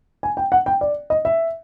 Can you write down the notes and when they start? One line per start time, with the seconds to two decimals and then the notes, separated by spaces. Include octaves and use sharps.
0.23 G#5
0.37 G5
0.52 F#5
0.66 G5
0.81 D5
1.10 D#5
1.25 E5